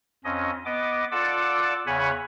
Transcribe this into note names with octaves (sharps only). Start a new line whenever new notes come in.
F2 C#4 D#5
B3 D#5 D6
F4 A4 D5 F#5 D6 E6
E2 C#3 C#5 F#5 G#5 B5